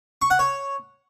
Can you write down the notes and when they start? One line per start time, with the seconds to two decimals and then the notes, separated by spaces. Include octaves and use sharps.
0.22 C#6
0.30 F#5
0.39 C#5